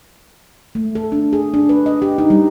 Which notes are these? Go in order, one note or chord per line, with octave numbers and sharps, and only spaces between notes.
A3
A4
D4
G#4
D4
B4
D#5
G4
D#4
G3